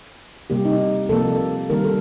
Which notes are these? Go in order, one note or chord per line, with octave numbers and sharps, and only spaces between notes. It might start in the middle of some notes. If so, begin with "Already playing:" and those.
C3 G3 A#3 G4
D#4
C3 F3 A#3 A4
D#3 G3 A#3 A#4
A4